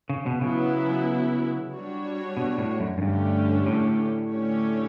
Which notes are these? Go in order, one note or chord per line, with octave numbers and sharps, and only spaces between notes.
C#3
B2
C#3 F#3 B3 E4
G3 D4 F#4 C#5
B2
A2
F#2
F#2
G2 D3 A3 C#4 G4
A2
D3 A3 C#4 G4 C#5